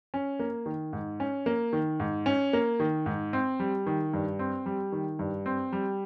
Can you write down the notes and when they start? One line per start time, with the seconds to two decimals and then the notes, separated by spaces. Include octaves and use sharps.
0.14 C#4
0.39 A#3
0.66 D#3
0.93 G#2
1.20 C#4
1.46 A#3
1.73 D#3
2.00 G#2
2.26 C#4
2.53 A#3
2.80 D#3
3.06 G#2
3.33 C4
3.60 G3
3.87 D#3
4.13 G2
4.39 C4
4.66 G3
4.92 D#3
5.19 G2
5.46 C4
5.73 G3